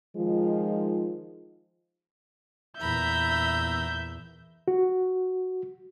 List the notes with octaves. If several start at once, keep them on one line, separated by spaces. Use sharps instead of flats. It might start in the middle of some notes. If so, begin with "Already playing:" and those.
D#3 F3 G#3 D#4 F4
E2 A#2 E5 A#5 B5 G6
F#4